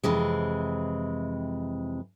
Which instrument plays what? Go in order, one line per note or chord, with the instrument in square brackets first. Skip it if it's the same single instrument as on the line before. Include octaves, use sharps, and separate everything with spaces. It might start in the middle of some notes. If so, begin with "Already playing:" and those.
[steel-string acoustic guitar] F2 C3 E3 G#3